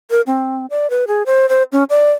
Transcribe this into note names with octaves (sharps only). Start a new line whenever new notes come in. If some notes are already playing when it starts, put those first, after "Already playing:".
A#4
C4
D5
B4
G#4
C5
C5
C#4
D5